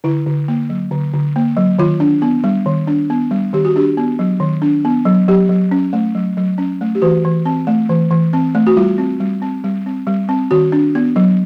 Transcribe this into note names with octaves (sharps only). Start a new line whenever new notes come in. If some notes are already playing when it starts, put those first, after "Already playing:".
D3 E4
D3
A#3
F#3
D3
D3
A#3
F#3
D#3 F4
D4
B3
G3
D#3
D4
B3
G3
D#3 G4
F#4
D4 G4
B3
F#3
D#3
D4
B3
F#3
F#3 G4
F#3
C#4
A3
F#3
F#3
C#4
A3
G4
E3 F#4
E3
C4
A3
E3
E3
C4
A3
F#4
G3 F4
C4
G3
C4
G3
C4
G3
C4
D#3 F#4
D4
B3
F#3